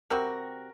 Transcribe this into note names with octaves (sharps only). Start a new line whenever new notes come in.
C3 G3 C4 F#4 A#4